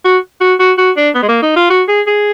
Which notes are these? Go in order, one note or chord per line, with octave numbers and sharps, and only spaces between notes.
F#4
F#4
F#4
F#4
D4
B3
G#3
A#3
D#4
F4
F#4
G#4
G#4